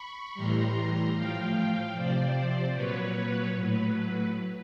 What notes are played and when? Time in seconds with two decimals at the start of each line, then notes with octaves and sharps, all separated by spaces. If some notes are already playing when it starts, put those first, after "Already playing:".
Already playing: B5 C#6
0.34 A2 E3 G3 A#5 C6
1.14 A2 F3 F5 G5
1.95 C3 F3 C5 D5
2.74 A#2 F#3 B4 C#5
3.55 A2 F#3 B4